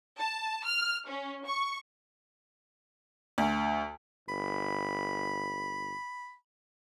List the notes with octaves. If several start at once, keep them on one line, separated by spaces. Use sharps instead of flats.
A5
F6
C#4
C#6
D2
G1 B5